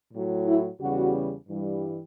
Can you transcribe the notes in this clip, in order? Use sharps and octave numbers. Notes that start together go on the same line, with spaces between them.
A2 F#3
E4
E2 C#3 G3 F#4
G2 E3 G3